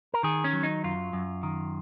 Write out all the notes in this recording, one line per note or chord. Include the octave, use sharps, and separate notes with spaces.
A#4
D#3 G#4
C#4
F#3
D#4
F#2 F4
F#2
D#3